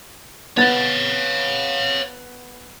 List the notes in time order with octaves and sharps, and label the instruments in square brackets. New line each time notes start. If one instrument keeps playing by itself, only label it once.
[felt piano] B3 A6 [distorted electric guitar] C#5 F5